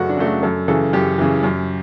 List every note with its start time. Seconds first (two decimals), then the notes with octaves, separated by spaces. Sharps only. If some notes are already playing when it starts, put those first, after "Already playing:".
Already playing: F#2 C#3 F#3 A3 F#4 A4 B4 D5
0.09 D4
0.17 C#3 F#3 A3
0.26 F#4
0.43 F#2 A4
0.68 C#3 E3 A4
0.93 F#2 G4
1.18 C#3 E3
1.43 F#2